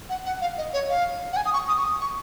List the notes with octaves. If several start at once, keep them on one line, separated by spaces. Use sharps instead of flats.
F#5
F#5
F5
D#5
C#5
F5
F#5
G#5
D#6
C#6
D#6
C#6
D#6
C#6